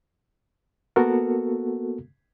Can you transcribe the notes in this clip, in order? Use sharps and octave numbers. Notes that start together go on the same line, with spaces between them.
A#3 B3 F#4 A4 A#4